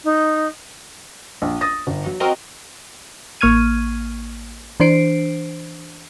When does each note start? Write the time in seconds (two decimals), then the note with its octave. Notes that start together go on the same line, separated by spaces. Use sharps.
0.04 D#4
1.42 A#1
1.61 D#6 A6 A#6
1.87 G1
2.06 F#3
2.20 C4 F#4 A#4 D#5
3.41 A1 A#3 C#6 F6 G#6 D#7
4.80 E3 D4 C5 C7 D7